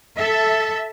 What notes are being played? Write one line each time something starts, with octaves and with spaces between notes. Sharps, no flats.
A4 E5